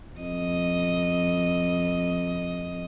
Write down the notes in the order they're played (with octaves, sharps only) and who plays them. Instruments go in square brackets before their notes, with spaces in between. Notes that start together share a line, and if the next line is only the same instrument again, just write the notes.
[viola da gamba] F2 D#5